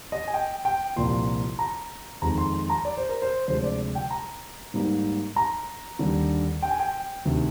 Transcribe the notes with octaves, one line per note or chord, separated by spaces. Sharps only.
D#5
G#5
G5
G5
C2 A#2 F3 A#3 C6
A#5
F2 D#3 G#3 A#5
C6
C6
A#5
D5
C5
A#4
C5
D2 C3 F3 G#3 C5
C5
D5
G5
A#5
G#2 G3 A#3 D#4
A#5
D#2 D3 G3 D4
G5
G#5
G5
D2 C3 D#3